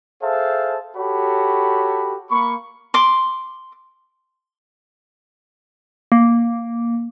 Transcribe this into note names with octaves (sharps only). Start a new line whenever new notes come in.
G#4 A4 C5 E5 F5 A5
F#4 G4 A4 C#5 B5
A#3 B5 C#6
C6 D6
A#3